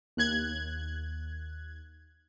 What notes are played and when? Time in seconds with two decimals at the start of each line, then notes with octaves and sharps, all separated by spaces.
0.17 D#2 F#6 G#6